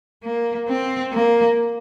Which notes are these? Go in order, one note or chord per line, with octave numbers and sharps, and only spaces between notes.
A#3
C4
A#3